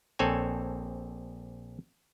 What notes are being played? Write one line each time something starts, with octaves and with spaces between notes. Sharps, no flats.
A#1 C4 A4 C#5 G#5